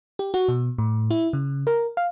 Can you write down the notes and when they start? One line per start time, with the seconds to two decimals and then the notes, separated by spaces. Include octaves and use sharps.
0.19 G4
0.34 F#4
0.48 B2
0.78 A2
1.11 E4
1.33 C#3
1.67 A#4
1.97 F5